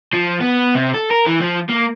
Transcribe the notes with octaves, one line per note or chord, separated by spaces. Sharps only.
F3
B3
C3
A4
A#4
E3
F3
A#3